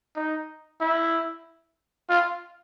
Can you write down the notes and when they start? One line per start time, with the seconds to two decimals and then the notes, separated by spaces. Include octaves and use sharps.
0.16 D#4
0.80 E4
2.09 F4